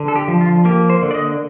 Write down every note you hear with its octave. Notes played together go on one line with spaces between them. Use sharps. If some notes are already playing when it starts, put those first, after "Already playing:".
Already playing: D3
A4
G4
F3
F4
A#3 G4
C5
D3
D5
D#5